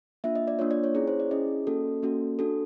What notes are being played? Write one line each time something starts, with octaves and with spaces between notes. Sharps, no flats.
A#3 D4 F4 E5
D#5
D5
A#3 D4 F4 C#5
D5
C#5
C#4 E4 G#4 C#5
C5
D5
C#4 E4 G#4 D#5
A#3 C#4 F#4 A4
A#3 C#4 F#4 A4
D4 F#4 A4